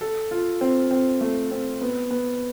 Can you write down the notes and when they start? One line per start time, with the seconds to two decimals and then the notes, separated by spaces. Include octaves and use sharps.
0.01 A4
0.31 F4
0.61 C4
0.91 C4
1.21 A3
1.51 C4
1.81 B3
2.11 B3